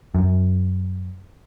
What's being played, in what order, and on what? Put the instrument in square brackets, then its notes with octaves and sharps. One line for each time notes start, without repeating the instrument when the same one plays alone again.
[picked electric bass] F#2